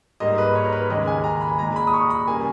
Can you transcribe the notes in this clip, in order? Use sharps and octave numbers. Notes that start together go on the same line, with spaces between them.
G#2 G3 A#3 D#5
B4
C#5
A#4
B4
D#2 C#3 G#3 D#5
G#5
A#5
B5
G#5
A#2 G#3 A#5
B5
D#6
C#6
B5
C#3 G3 A#3 G#5